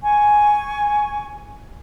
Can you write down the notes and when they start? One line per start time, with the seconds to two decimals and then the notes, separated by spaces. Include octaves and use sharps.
0.02 G#5 C#6